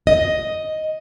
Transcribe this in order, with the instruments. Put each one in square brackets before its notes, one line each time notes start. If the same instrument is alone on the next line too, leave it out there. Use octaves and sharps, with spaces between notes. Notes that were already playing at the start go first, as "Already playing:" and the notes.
[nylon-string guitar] D#5